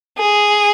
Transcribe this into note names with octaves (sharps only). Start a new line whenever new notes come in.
G#4